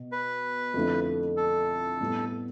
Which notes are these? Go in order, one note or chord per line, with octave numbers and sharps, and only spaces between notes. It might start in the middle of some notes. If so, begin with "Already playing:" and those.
Already playing: B2
B4
F2 D3 F3 A3 E4
A4
A2 G3 B3 E4